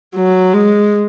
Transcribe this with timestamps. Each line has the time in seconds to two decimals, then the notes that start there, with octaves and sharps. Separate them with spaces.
0.16 F#3
0.54 G#3